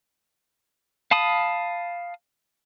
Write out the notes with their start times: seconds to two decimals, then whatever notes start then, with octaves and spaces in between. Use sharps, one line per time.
1.11 F5 A5 B5 D#6